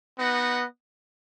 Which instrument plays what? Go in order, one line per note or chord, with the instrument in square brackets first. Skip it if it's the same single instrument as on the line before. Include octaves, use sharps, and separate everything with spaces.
[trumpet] B3 [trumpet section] D#4 F#4 B4 D#5 F#5